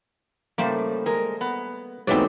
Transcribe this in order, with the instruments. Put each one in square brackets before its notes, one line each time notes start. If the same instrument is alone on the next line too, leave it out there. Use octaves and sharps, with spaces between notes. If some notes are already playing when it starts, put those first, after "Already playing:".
[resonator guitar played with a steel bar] A2 C#3 [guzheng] G3 A3 C5 [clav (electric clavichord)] A#3
[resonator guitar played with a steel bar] G#3 A#4
B3
[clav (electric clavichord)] G#2 E3 B3 [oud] F#3 A3 C4 [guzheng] D#4 D5